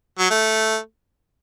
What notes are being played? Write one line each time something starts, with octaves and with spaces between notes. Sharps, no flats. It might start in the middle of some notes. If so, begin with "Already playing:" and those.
F#3
A3